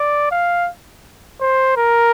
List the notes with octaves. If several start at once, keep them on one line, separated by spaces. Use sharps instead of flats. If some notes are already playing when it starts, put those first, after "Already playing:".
Already playing: D5
F5
C5
A#4